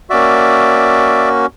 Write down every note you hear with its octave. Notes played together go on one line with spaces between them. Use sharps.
A#3 C#4 F#4 D5 E5